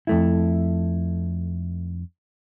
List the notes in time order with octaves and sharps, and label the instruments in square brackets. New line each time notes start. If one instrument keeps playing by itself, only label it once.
[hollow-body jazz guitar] F2 A3 E4